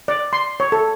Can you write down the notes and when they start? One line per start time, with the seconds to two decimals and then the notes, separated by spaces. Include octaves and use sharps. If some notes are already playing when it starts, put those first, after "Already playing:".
0.08 D5
0.33 C6
0.60 C#5
0.72 A4